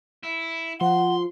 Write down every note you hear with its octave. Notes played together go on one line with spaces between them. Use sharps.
E4
F3 F#5 C6